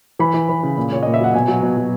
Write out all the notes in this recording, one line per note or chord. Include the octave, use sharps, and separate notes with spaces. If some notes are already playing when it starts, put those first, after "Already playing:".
E3 B5
E3
E3
C#3
A#2
A#2 C#5
A#2 D#5
E5
F#3 F#5
B2 G#5
F#3
B2
F#3